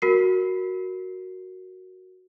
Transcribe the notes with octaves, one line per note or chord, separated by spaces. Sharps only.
F#4 A#4 C7